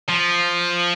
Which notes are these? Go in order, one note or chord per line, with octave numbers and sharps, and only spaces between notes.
F3